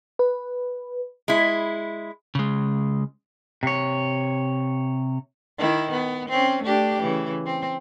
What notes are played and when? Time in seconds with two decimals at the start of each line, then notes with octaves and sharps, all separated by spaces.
0.19 B4
1.28 G#3 E4
2.35 C#3 G#3
3.63 C3 C#5
5.58 D#3 E4
5.92 B3
6.29 C4 C#4
6.63 A3 D4 G4
7.01 C#3 E3
7.45 C4